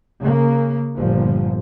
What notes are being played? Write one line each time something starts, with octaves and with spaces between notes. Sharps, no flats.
C#3 A#3
G1 A#2 F3